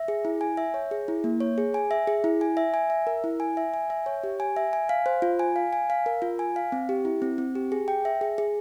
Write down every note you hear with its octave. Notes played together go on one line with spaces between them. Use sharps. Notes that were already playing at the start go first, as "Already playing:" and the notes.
Already playing: E5
G#4
E4
G#5
E5
C#5
G#4
E4
A#3
C#5
G#4
G#5
E5
G#4
E4
G#5
E5
G#5
E5
A#4
E4
G#5
E5
G#5
E5
C#5
G4
G#5
E5
G#5
F5
C5
F4
G#5
F5
G#5
F5
A#4
F4
G#5
F5
C4
G4
E4
C4
C4
G4
G#4
G5
E5
G#4
G#4